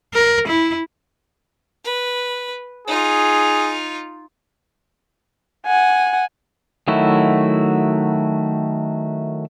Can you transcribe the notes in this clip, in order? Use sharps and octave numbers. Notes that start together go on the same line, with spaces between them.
A#4
E4
B4
D#4 F4 G#4
F#5 G#5
D#3 F#3 A3 E4 F#4